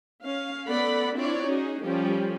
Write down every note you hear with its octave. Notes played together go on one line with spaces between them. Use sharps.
C#4 F5
A3 B3 A4 D5 F#5 B5
C4 D4 E4 F4 C#5 D5
C#4 D#4 F#4 G#4
F3 G3 C#4 G4 A4